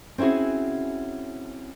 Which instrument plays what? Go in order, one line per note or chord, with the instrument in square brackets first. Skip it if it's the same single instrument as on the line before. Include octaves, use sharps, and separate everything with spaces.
[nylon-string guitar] C4 C#4 E4 F#4 G#4